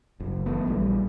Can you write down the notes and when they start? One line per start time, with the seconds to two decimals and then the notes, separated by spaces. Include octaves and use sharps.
0.20 F#1
0.46 E3 A3 B3
0.65 A#1 D3 G3